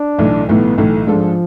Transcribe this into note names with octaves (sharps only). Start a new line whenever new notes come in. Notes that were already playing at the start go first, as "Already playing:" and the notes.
Already playing: D4
B1 A2 E3 A3
B1 A2 E3 A3 B3
B1 A2 E3 A3
G#2 F3 G#3 D4 F4 A4